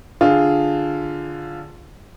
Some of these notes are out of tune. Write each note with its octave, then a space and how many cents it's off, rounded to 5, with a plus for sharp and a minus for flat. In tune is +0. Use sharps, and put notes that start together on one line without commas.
D3 +0 F4 +0 G#4 +0